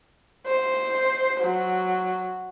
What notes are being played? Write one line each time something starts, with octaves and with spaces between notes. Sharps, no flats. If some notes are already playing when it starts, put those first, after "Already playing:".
C5
F#3